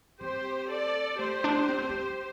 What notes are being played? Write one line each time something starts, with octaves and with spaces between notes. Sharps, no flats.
C4 G4 C5
A4 D5
A3 G4 C5
D4
C4
A3
C4
C3